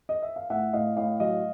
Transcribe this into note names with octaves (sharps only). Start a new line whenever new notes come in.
D#5
E5
F5
A2 E5 F#5
A2 D#5 F5
A2 D#5 F5
F#3 D#5 F5